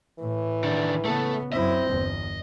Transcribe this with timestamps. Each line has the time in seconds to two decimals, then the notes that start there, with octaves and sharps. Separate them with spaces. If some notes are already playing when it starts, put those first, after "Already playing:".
0.19 A2 E3
0.64 D#3 D4
1.05 C#3 A3 B3 A4
1.52 F#2 C4 E4 D#5
1.87 G1 E2